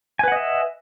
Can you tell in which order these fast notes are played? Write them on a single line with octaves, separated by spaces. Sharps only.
G#5 B4 F#5 D#5 E5